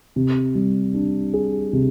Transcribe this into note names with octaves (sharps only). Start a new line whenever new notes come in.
C3
G3
D4
G#4
C3